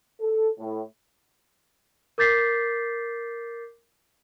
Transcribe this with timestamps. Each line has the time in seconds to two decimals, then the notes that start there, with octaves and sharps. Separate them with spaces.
0.21 A4
0.59 A2
2.18 A#4 D6 G6 A6 B6 C7